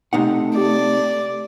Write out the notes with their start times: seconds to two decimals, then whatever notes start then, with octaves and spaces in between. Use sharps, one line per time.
0.13 C3 A3 D#4 F#5
0.57 G4 D5